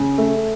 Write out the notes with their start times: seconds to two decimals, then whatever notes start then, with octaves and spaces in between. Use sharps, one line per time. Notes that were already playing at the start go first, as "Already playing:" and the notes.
Already playing: C#3
0.18 A3